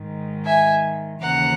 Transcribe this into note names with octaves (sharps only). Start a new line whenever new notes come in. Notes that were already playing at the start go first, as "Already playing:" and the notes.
Already playing: G#2 D#3
E5 G#5
D#2 C#3 E3 F#5 A#5